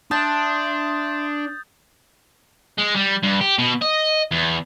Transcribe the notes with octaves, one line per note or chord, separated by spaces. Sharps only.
D4 E5 A5 C6 D#6 G6 A6
G#3
G3
G2
G4
B2
D#5
E2